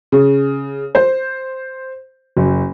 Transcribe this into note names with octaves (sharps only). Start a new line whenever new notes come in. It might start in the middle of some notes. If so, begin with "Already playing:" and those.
C#3
C5
F#1